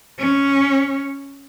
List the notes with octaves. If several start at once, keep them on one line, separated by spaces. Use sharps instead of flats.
C#4